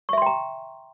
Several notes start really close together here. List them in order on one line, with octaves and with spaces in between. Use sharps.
C#6 E5 C6 G5 A#5